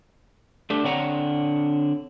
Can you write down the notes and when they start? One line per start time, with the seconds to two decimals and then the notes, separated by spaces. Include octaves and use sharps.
0.70 A3 D4 G4
0.84 D3 C4 D4 C#5 F#5 A#5